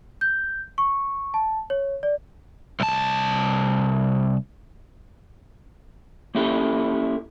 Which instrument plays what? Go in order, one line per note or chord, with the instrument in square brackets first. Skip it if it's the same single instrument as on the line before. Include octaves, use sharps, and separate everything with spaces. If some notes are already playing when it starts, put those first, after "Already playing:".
[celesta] G6
C#6
A5
C#5
D5
[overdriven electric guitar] C2 A5
[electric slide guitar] A#3 C#4 E4 G4 A4